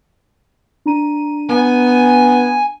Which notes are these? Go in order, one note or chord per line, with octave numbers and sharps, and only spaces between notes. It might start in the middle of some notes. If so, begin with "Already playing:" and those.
D4 A#5 D#7
B3 G#5